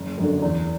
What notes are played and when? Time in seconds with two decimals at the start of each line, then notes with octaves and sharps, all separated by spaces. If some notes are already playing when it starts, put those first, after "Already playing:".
Already playing: F#1
0.18 F#2 D3
0.42 E2